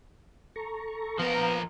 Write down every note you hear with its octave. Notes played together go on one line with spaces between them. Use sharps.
A4 A#5 C#6
F3 B3 A#4 F5 A#5